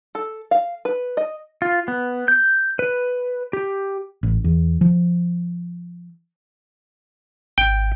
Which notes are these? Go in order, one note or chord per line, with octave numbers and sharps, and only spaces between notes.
A4
F5
B4
D#5
F4
B3
G6
B4
G4
A1
E2
F3
G#1 G5